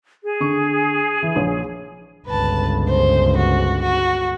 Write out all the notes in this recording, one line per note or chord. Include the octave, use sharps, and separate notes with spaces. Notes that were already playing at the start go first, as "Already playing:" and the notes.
G#4
D3 C#6
E3
A#1 C#5
G1 C#2 B4 A5
C5
F#4
F#4